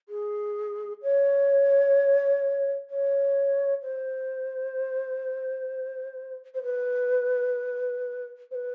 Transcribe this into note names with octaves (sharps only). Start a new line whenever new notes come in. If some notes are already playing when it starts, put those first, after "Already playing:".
G#4
C#5
C#5
C5
C5
B4
C5
B4